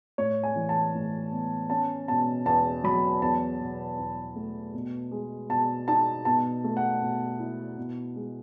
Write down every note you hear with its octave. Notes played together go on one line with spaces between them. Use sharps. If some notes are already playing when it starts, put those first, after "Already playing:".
A2 C#5
G#5
E3
A5
A2
B3
C#4 A5
B2 A5
E2 A5
F#3 B5
E2 A5
B2
E2
A3
B2
G#3
B2 A5
D#4 A5
B2 A5
A3
F#5
B2
E4
B2
G#3